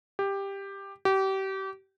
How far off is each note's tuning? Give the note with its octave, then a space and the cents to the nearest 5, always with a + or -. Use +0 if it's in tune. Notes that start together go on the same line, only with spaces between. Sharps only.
G4 +10
G4 -30